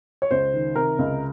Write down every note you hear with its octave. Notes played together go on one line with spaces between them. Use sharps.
C#5
C#2 C5
D#3
C3 A#4
C#2